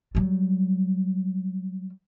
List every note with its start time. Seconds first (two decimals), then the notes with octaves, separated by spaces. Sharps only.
0.15 F#3 G3